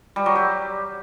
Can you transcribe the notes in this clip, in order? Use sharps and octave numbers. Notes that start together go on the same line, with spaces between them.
G3
F#3
G4